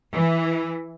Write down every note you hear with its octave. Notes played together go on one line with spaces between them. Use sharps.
E3